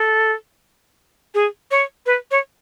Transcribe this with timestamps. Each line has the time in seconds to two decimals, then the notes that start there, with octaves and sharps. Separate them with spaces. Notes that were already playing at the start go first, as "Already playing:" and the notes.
Already playing: A4
1.35 G#4
1.71 C#5
2.06 B4
2.31 C#5